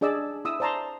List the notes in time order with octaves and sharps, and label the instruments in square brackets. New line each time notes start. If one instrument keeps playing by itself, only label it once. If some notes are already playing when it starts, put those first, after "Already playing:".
[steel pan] D4 G#4 D5 D#5 E6
E4 D#6 E6
C5 D5 A5 A#5 C6